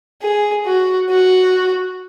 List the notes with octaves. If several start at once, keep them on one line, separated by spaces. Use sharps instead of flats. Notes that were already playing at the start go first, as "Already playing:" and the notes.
G#4
F#4
F#4